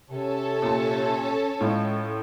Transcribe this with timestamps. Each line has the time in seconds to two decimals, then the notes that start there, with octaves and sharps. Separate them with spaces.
0.10 C3 C#4 A4 C#5
0.62 A#2 A5
1.61 A2 G#3 F4